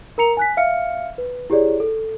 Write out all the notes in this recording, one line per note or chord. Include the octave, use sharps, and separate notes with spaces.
A#4 A#5 C#7 F7
G#5 F#6 B6
E5 F5 F6 C#7
B4
E4 G4 G#4 C#5 D5
A4